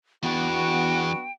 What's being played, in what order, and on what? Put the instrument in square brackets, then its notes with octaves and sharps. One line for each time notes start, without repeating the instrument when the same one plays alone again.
[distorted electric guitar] E2 [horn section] B3 D4 F#4 [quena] G5